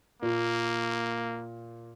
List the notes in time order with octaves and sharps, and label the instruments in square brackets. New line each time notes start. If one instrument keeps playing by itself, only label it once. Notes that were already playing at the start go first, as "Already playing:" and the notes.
[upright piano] A#2 [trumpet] A#3